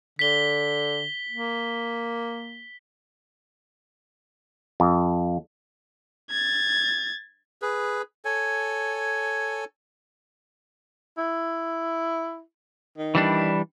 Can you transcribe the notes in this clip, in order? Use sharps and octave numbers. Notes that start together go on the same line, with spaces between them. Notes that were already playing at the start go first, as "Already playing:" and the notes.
D3 B6 G7
A#3
F2
G#6 A6
G#4 B4
A4 C#5 G#5
E4
D#3
E3 G3 D4